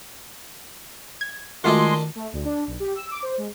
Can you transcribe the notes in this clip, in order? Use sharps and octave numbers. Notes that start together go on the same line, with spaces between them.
G#6
D#3 G#3 A3 D4 D#4 F4 F#4 C6
A3
D2
D4
B1
G4
E6
D6
C5
G#3